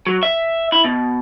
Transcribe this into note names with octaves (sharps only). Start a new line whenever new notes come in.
F#3
E5
E4
B2